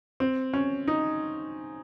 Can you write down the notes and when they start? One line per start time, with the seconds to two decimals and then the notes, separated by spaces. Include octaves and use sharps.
0.20 C4
0.53 C#4
0.88 D#4